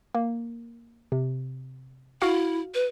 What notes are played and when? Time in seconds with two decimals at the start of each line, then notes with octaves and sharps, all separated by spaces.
0.15 A#3
1.12 C3
2.22 E4 F#4 F5
2.74 B4